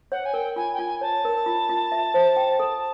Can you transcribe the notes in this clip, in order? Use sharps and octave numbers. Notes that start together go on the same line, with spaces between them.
C#5 F#5
G#5
A#4 G5
F4 G#5
G5
F4 G#5
C#5 A5
A#4
F4
F4
E5
C5
G5
A4